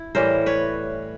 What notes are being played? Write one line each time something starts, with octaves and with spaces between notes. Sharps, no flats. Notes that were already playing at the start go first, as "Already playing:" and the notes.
Already playing: E4
A2 E3 G3 A#4 C5
B4 C#5